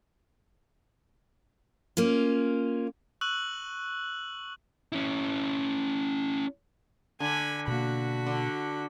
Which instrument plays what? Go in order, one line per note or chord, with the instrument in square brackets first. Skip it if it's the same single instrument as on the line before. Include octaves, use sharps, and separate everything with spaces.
[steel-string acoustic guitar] A#3 C#4 F4
[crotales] C#6 E6 F#6 F#7
[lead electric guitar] C#4 E4
[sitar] D3 [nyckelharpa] G#5 B5
[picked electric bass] B2 A#3 [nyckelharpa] F#4 B5
[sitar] D3